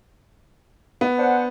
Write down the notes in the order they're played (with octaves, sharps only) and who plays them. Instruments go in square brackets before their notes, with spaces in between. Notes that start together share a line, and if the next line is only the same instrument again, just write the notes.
[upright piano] B3
[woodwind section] D4 C5 F#5